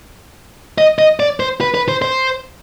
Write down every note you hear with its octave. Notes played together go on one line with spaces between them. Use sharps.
D#5
D#5
D5
C5
B4
B4
C5
C5